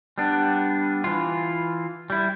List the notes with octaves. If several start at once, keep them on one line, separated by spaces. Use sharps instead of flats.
G3 B3 D4
E3 F4
G3 E4